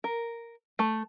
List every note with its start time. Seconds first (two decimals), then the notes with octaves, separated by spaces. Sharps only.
0.04 A#4
0.79 A3